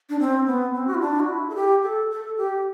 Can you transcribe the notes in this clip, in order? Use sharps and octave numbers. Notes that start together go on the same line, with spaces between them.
D4
C4
B3
C4
F#4
E4
D4
F#4
E4
A4
G4
A4
A4
G4